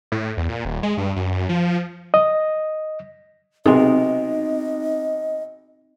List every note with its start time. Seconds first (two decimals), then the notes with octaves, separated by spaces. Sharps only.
0.12 A2
0.37 E2
0.49 A#2
0.65 D#1
0.83 G#3
0.97 G2
1.16 F#2
1.49 F3
2.14 D#5
3.66 B1 C3 C4 D#4 G#4 D#5